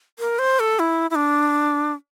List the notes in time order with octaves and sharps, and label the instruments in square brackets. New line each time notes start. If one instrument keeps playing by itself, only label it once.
[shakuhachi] A#4
C5
A4
E4
E4
D4